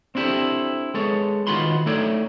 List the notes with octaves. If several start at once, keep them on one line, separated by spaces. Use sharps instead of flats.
C4 D4 E4 G4 A4
G#3 B3 A4 C#5
D#3 B3 F4 F#4 B5 C6
A3 D#4 A4 C#5 D5